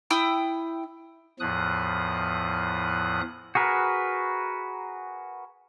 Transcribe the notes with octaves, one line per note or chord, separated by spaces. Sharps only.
E4 G5 D#6
E2 A2 F3 D#6 F#6
F#4 G#4 A#4 B4